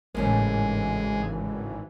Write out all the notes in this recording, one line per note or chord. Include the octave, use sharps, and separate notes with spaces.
G#1 A2 C#3 E3 G#3 A#3